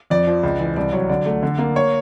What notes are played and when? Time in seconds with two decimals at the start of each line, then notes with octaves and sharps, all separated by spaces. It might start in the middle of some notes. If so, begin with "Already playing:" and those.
0.10 F2 D5
0.27 F3
0.43 C#2
0.59 E3
0.76 C2 D5
0.93 F#3 C#5
1.09 D3 D5
1.26 A3
1.43 D3
1.58 A#3
1.76 C#5